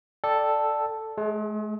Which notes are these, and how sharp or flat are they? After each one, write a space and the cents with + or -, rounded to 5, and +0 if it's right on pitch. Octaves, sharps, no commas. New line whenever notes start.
A4 +0 D5 +10 G5 -5
G#3 +45 G#4 +0